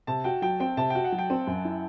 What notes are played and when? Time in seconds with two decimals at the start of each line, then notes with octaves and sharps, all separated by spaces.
0.07 C3 A5
0.24 F#4 G5
0.42 F#3 G5
0.60 C4 G5
0.77 C3 A5
0.90 F#4 G5
1.04 F#5
1.12 F#3
1.19 G5
1.30 C4
1.47 F#2
1.65 E4